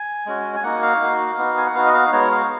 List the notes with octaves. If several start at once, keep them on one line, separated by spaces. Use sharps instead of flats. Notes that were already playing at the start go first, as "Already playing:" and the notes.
Already playing: G#5
G#3 C#4 F#4
G#5
A#3 D#4 F#4 F#5
F5
A#3 D#4 F#4
B3 D#4 F#4
G#5
F#5
B3 D#4 F#4 F5
D#5
F5
G#3 B3 D#4 F#4 C#5
F5